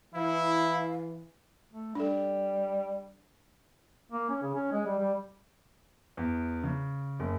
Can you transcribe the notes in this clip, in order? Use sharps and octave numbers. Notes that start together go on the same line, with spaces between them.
E3 E4 F5
A3
G3 D4 A4
A#3
C#4
C#3
C#4
G#3
G3
G3
E2
C#3
F#1